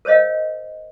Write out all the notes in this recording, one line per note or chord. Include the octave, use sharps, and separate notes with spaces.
A#4 C5 C#5 D#5 F5